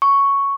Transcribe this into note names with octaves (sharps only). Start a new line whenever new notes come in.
C#6